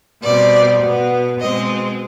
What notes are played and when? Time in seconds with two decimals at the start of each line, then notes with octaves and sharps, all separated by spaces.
0.24 B2 G3 C4 D5
0.82 B2 B3
1.41 B2 G#3 C4 D#5